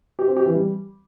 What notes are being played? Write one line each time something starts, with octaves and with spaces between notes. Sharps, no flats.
G4
C4
G4
E3
G3